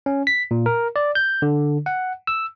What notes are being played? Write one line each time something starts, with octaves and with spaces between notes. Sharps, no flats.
C#4
B6
A#2
A#4
D5
G6
D3
F#5
E6